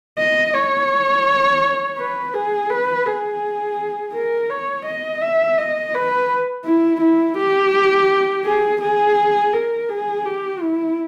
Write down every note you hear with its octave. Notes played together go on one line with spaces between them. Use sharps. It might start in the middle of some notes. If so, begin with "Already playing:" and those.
D#5
C#5
B4
G#4
B4
G#4
A#4
C#5
D#5
E5
D#5
B4
E4
E4
G4
G#4
G#4
A#4
G#4
G4
E4